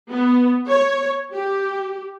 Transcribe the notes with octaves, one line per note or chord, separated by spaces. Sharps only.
B3
C#5
G4